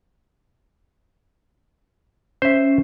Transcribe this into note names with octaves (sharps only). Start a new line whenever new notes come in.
C#4 C5 E5